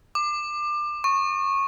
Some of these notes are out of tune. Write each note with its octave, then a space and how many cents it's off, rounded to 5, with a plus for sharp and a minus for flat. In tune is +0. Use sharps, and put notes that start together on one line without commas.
D6 +25
C#6 -15